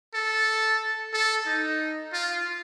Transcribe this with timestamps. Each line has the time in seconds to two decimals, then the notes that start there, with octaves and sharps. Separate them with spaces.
0.14 A4
1.13 A4
1.46 D#4
2.13 F4